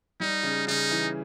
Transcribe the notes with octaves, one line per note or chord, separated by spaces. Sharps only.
G3 D#4
C#3
C#3 D#4
E3